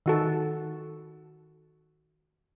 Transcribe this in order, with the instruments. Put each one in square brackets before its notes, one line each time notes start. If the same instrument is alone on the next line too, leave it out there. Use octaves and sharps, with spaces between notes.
[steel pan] D#3 F#4 A4